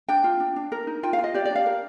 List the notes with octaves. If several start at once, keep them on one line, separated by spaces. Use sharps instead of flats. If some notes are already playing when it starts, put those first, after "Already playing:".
D4 G5
F4
D4
D4
A#4
D#4
F4 G5
F5
F4
D#5
G4 D5
D5
D4 F5
A#4